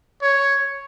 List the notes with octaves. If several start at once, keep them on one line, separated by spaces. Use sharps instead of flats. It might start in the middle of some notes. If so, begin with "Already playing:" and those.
C#5